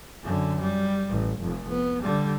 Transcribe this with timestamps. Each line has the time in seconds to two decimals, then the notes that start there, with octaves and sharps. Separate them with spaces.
0.23 F#2 D3
0.62 G3
1.09 A1
1.41 F1 F2
1.70 B3
2.03 D3 G3